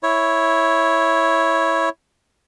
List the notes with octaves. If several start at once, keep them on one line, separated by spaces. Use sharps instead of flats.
E4 C#5